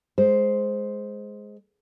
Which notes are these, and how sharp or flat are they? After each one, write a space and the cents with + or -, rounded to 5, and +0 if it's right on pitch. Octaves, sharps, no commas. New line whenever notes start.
G#3 +5 C5 +0